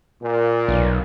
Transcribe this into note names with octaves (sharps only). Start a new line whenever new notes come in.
A#2
B1